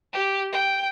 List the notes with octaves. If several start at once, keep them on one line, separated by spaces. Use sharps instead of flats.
G4
G5